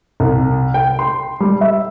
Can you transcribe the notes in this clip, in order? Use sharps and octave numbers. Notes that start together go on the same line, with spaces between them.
C2
G5
C6
G3
E5